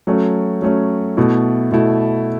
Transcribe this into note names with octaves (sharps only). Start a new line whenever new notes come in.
F#3 A3 C#4
F#3 A3 C#4
B2 A3 E4
B2 A3 E4